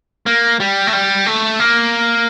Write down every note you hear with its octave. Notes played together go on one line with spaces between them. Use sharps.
A#3
G3
A3
G3
A3
A#3